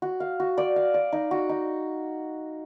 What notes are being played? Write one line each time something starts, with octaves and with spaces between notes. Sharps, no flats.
F#4
F5
F#4
D5
F5
D5
D#4
F#4
D#4